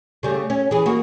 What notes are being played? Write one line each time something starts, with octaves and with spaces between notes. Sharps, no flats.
C#3 G3 A3
C#4
E3 G#4
A#3 F#4